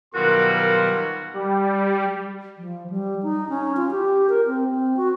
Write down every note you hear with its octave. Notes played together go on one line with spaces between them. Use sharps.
B2 D#3 F#3 G3 F4 F#4 A#4 C6
G3
F3
G3
D#4
C#4
F4
G4
A#4
C4
C4
F#4